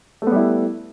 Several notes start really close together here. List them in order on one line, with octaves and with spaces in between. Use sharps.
A3 B3 G3 E4